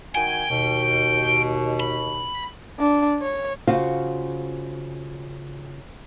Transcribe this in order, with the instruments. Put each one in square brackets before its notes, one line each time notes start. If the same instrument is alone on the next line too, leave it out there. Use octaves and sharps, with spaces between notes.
[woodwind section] D#3 F#4 G#5 [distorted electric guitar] G5
[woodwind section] D#2 B2
[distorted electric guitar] B5
[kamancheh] D4
C#5
[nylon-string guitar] C#3 F4 F#4 C5 F5